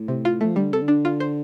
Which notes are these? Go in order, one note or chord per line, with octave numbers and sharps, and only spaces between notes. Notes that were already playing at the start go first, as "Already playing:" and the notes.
Already playing: A2
C3
F4
F3 A3
D3 G3
C3 A4
D3
D4
F4
C5